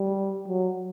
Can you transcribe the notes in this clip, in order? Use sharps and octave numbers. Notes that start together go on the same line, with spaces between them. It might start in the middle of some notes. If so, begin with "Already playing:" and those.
Already playing: G3
F#3